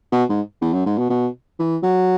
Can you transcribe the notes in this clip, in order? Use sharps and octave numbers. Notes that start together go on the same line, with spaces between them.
B2
G#2
E2
F#2
G#2
B2
B2
E3
F#3